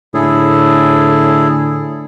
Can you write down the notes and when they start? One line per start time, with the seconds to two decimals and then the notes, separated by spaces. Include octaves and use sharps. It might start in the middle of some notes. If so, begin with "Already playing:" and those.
0.14 A2 D3 E4 G#4 A4